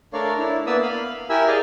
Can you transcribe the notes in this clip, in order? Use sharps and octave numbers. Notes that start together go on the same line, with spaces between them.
A3 D4 A#4 C#5 D5 F5
D4 E4
A#3 B3 D5 E5 D#6 E6
F5 B5
E4 G4 A#4 E5 G#5 E6
G#4 A#4 D5 D#5 F5